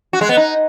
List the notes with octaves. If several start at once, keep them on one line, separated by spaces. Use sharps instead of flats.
F#4
G#3
B3
D#4